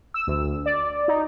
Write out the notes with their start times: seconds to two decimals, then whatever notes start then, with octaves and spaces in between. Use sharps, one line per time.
0.14 E6
0.27 D2
0.66 D5
1.08 D#4